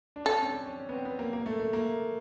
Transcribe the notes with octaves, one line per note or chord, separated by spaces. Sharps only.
D4
C#4 A4
C4
D4
C#4
C#4
C#4
B3
C4
B3
A#3
A#3
A3
A3
A#3